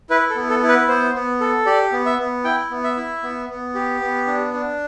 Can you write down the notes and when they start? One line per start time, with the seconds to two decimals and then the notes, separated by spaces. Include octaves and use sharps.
0.10 E4 B4
0.30 A4
0.36 B3
0.49 A4
0.63 E4
0.68 B4
0.88 B3 C5
1.14 B3
1.41 A4
1.66 G4 D5
1.93 B3
2.06 E5
2.18 B3
2.44 E4 G5
2.71 B3
2.84 E5
2.97 E4
3.23 B3
3.49 B3
3.75 G4
4.01 B3
4.27 D4
4.54 D4